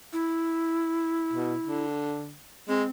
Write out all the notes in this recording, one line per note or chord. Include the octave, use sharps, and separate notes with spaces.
E4
B2
D3
G#3 C4